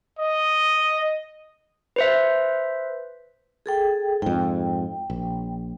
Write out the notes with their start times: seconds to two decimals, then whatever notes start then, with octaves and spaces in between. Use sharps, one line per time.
0.19 D#5
1.96 B4 C5 E5
3.66 G#4 A4 G5
4.22 F2 G#2 G5
5.10 A#1